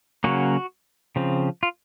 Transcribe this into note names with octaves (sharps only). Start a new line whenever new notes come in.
C#3 F#3 A#3 C#4 F#4
C#3 F3 C4
F4